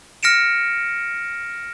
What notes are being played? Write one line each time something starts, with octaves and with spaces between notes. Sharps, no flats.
F6 A#6 C#7 D7 E7